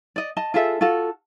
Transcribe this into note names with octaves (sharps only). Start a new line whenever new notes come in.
D5 D#5
D#5 A5
F4 G#4 A4 E5
F4 F#4 A4